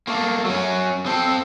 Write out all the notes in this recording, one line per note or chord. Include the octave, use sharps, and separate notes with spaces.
A3 A#3
F#3 C#4
C4 A4